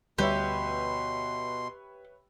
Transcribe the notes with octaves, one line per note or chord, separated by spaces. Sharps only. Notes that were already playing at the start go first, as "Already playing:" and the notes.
D2 B2 G3 G4 B4 C#5 E5 C6